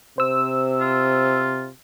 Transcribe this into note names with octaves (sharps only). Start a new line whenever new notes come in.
C3 C5 E6
F4